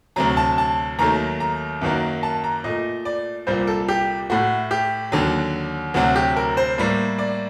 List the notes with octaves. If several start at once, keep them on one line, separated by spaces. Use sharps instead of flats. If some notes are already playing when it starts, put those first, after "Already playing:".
D2 C3 F#3 A#5
A5
A5
D#2 D#3 F#3 A3 A#5
A#5
F#2 D#3 F#3 A#3
A5
A#5
A#2 A3 D#5
D5
C2 A#2 G3 A#3 C5
A4
G4
A2 A3 F#4
G4
D#2 D3 F#3
D2 C3 F#3 F#4
G4
A#4
C5
A2 G3 A#3
D5